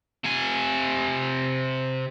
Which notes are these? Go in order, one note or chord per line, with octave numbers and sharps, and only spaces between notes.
C3 G#5